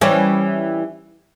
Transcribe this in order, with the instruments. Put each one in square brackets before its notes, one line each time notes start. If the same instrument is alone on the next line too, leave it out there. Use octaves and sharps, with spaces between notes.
[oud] E3 G3 C#4